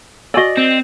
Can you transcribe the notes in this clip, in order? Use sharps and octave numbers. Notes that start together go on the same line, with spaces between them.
F#4 D5 D#5 G#5 E6
C4